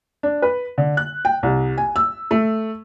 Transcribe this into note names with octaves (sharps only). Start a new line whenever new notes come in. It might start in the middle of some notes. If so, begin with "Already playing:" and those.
D4
B4
D3
F#6
G5
C2
G#5
E6
A3